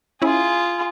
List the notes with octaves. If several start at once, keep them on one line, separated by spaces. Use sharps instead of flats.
C#4 E4 F4 G#4